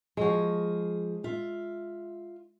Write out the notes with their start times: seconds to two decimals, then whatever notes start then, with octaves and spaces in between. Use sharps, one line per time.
0.17 F3 G#3 F#4 G#4
1.24 F4 E5